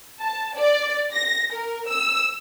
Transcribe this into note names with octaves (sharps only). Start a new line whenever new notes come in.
A5
D5
A#6
A#4
E6